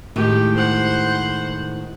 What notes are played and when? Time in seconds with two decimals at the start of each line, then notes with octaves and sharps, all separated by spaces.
0.16 A2 D#3 G#3 G4
0.56 C5 F#5